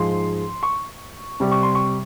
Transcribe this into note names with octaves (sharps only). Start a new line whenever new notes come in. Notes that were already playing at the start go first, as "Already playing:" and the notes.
Already playing: G#2 F3 G#3 C6
C#6
C3 G3
C#6
C6
C#6